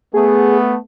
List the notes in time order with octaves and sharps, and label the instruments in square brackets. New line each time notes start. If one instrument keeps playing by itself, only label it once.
[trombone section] A3 B3 [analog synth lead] G#4